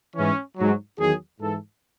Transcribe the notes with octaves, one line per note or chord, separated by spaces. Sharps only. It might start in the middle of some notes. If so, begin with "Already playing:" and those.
G#2 E3 C#4
G#2 F#3
E2 D#3 F#3 G#4
G#2 E3 A4